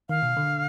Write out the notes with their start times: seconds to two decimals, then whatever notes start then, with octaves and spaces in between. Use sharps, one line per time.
0.09 D#3 F5
0.23 B2
0.37 D3